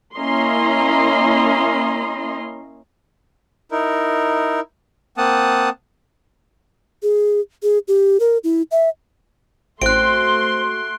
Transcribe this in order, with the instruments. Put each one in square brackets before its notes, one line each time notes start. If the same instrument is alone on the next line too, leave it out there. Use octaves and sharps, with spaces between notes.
[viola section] A#3 C#4 E4 D#5 A#5 C6
[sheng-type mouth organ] D#4 E4 A#4
A#3 C4 F#5 A5 D#6
[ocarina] G#4
G#4
G4
A#4
E4
E5
[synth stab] A1 [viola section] A3 F#4 C6 [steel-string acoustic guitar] C4 [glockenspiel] F#6 D7